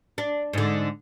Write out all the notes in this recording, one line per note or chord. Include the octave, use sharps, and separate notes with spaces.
D4
G#2 D3